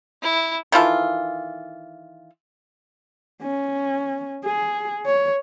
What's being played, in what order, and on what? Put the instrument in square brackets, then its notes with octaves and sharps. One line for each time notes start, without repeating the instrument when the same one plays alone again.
[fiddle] E4
[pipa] D#3 E3 F4 A4
[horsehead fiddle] C#4
G#4
C#5